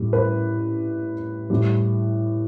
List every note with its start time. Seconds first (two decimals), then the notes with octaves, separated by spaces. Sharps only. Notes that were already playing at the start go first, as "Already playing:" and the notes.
Already playing: A2 G3
0.13 B4
1.50 A2 G3